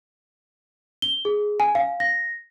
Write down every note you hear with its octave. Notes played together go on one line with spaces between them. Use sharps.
G7
G#4
G#5
F5
A#6